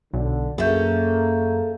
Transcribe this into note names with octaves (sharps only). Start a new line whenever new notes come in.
B1 D3
F#2 A3 A#3 C#4 G#4 A4 E5 G6